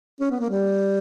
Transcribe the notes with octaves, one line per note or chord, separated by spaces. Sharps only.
C#4
B3
A#3
G3